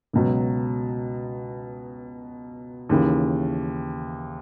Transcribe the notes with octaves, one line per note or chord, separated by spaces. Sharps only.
C#2 B2 F#3
D#2 C#3 E3